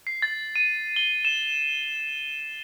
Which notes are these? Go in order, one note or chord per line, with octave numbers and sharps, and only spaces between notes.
C7
A6
D#7
G7
E7